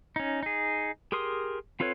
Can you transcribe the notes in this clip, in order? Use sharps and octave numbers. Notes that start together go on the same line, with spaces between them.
C#4 D#4
D#4 G#4
G4 G#4 A#4 C6 D#6
C4 F4 A4 B4 C#5